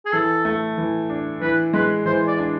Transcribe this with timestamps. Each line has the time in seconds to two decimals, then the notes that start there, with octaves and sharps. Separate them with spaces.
0.05 G#4
0.12 E3 A4
0.45 A3
0.78 E3
1.10 D4
1.41 E3 B4
1.73 G#3 B4
2.06 E3 C5
2.28 D5
2.38 D4